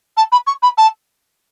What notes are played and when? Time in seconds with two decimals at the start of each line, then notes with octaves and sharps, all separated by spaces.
0.17 A5
0.32 B5
0.46 C#6
0.62 B5
0.77 A5